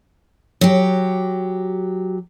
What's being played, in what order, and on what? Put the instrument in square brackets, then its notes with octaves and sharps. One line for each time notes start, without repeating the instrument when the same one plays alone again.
[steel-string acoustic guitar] F#3 G4